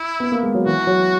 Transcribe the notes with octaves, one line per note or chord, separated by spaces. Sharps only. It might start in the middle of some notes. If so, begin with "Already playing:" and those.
Already playing: E4
B3
A#3
G#3
F#3
E3 F#4
F#3